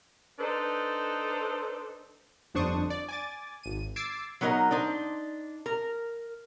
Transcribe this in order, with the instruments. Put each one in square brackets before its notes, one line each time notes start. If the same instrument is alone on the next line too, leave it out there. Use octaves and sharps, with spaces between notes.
[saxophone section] D4 D#4 A4 B4 C5
[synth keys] G1 F2 D4 C5 C#6 D#6
D5
G#5 D6 A6
G#1 D#7
D6 E6 G#6 A6 C7 D7
[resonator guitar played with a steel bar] F#3 B3 D#4 A#4 D#5
D4 D#4 C5
A#4